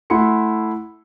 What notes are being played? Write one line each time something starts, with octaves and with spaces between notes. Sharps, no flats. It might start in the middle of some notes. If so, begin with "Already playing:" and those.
A3 E4 F#5 B5 C6 C#7